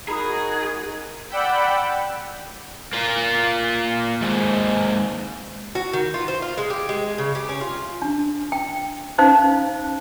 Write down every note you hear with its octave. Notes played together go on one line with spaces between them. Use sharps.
D#4 F#4 G#4 A#4 A#5 B5 D#6
D5 F#5 G5 B5 E6 G6
A#3 F4
D#2 G#2
F#4
D#3
F4
C5
F4
G#3
G4
G#3
C#3
G4
C#4
F4
D4
G5
C#4 D#4 C5 F5